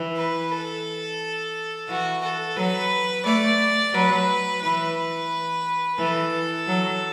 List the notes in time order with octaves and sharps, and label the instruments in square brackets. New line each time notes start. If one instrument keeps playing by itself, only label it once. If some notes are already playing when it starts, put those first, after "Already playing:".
Already playing: [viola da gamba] E3
[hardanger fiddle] B4
A4
[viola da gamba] E3 [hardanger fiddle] F#4
[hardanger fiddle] A4
[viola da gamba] F#3 [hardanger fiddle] B4
[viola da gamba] A3 [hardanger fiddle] D5
[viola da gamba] F#3 [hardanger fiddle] B4
[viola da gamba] E3 [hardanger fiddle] B4
[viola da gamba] E3 [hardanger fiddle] A4
[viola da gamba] F#3